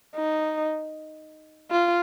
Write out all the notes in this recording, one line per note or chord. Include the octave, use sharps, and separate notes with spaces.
D#4
F4